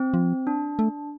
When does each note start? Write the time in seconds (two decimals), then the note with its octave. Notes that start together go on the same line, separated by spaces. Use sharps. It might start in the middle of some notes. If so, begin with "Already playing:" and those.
Already playing: C4
0.14 F3
0.47 D4
0.79 A3